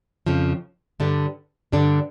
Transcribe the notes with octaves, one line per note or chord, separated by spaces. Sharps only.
F2 C#3 F3
G2 D3 G3 D4
G2 D3 G3 D4